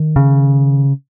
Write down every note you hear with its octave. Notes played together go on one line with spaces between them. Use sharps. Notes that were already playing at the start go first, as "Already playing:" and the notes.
Already playing: D#3
C#3